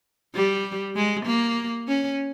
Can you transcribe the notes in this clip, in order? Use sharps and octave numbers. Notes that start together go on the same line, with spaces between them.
G3
G#3
A#3
C#4